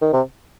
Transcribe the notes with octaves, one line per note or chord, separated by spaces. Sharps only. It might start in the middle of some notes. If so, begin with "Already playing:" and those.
D#3
C3